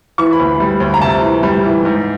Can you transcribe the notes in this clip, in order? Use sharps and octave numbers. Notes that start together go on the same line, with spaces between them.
E3 C#6
B5
D2
G3
D2
A#5
C3 A5
E3
G3
E3
G#2